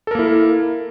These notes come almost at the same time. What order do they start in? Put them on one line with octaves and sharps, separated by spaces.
A4 A#4 A#3 E4